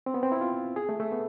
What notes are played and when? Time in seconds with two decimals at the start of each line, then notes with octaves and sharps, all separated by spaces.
0.06 C4
0.14 B3
0.23 C4
0.32 E4
0.41 F4
0.76 G#4
0.89 A3
1.00 A3
1.12 B3